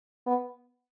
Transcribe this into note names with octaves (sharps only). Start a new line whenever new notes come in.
B3